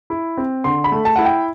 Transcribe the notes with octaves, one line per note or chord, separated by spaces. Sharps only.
E4
C4
D3 C6
B5
A3
A5
E4 F#5
G5